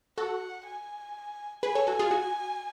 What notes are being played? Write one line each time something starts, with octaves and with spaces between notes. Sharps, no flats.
F#4 A4 F#5
G#5
G#4 B4 G#5
A4 C#5
F#4 A4
F4 G#4
F#4